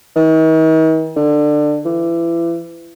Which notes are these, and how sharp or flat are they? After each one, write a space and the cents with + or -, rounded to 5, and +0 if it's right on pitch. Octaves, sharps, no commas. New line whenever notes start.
D#3 +45
D3 +20
E3 +30